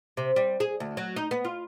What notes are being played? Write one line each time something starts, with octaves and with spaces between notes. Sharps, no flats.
C3
G3
G#4
D2
F#3
D#4
B3
F4